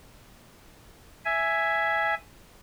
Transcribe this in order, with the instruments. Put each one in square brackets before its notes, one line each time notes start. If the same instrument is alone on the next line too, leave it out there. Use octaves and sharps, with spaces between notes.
[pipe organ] E5 G#5